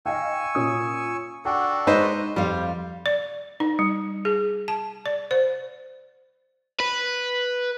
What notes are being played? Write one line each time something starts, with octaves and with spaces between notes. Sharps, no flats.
D#5 F5 G5 G#5 C#6 E6
A#2 C#4 D#6
D4 F#4 A4 F#5 G5
G#3 D#4 B4 C5 D#5
F2 G3 C5 F5
D5
D#4
G3
G#4
A5
D5
C5
B4